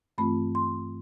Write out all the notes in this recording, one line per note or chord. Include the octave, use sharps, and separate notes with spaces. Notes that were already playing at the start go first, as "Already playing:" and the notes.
G2 E3 A3 C4 F4 B5
C6